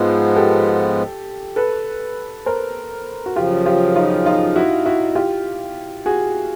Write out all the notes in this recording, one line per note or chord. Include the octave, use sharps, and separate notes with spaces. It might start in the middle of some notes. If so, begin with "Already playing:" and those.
Already playing: G#2 F3 G#3 B3
G4 A4
A4 B4
A#4 C5
F#4
F#2 C#3 F3 F4 G4
F4 G4
D#4 F4
D#4 F4
E4 F#4
E4 F#4
F4 G4
F#4 G#4